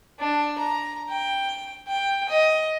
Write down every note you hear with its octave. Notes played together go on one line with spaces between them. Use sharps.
D4
A#5
G5
G5
D#5